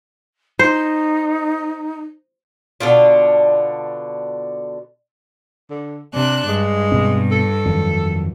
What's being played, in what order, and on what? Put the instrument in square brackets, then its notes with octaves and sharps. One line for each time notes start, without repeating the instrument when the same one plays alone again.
[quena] D#4 [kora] C5
[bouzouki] B2 D3 D4 F4
[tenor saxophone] D3
[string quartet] C3 D4 F#6 [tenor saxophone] D5
[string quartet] G2 [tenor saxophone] G#3
[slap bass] B2 C4
[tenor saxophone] A4
[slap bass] F2 D#3 F#3